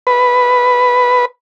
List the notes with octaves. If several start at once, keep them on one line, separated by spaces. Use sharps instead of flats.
B4